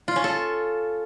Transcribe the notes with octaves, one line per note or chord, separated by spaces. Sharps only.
F4
C#4
A4